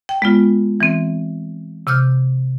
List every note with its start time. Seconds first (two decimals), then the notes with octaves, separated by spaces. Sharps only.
0.09 G5
0.22 G#3 B3 F4
0.80 E3 C4
1.87 C3 D6 F6 G6